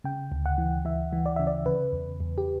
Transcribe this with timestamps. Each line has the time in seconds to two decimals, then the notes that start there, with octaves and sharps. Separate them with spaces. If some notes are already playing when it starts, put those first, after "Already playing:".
0.04 C#3 G5
0.32 D2
0.46 F#5
0.58 E3
0.85 E3 E5
1.13 E3
1.26 D5
1.36 C#3 E5
1.47 D5
1.66 C#3 B4
1.93 E2
2.20 E2
2.38 G4